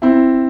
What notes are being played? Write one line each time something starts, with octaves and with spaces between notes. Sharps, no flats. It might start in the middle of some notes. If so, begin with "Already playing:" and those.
C4 E4